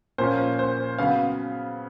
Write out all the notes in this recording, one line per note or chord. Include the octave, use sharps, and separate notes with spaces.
A#2 F3 A#3 C#4 C5
C5
C#3 F#3 B3 F5